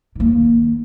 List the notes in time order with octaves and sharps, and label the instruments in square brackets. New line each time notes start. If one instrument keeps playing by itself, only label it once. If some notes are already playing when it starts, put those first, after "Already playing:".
[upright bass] D#3 A#3